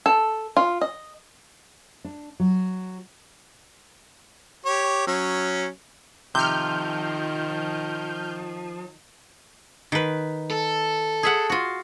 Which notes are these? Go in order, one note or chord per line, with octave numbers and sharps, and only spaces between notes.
A4
F4
D#5
D4
F#3
G4 C#5
F#3 C#4
C3 D#3 F3 F6 G6
D#3 B4
A4
G#4 E5 F#5
F4 F#4